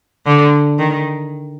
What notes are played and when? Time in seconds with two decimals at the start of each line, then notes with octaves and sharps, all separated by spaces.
0.26 D3
0.79 D#3